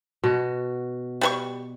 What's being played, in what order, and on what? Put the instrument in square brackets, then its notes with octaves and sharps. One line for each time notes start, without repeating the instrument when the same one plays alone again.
[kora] B2 F#4
[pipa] G3 B4 C#6